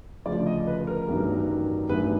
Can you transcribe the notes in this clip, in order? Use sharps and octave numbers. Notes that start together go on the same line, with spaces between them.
D2 C#3 F3 D5
D#5
B4
A#4
A1 G2 D#3 F#3
A1 G2 D#3 F#3 B4